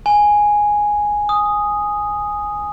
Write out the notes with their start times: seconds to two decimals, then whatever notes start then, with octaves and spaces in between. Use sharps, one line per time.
0.06 G#5
1.29 D#6